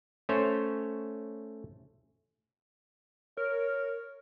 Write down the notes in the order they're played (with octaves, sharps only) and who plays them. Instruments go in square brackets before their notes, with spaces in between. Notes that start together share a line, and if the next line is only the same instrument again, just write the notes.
[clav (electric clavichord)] A3 C#4 C5 C#5
[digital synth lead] A#4 [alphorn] C#5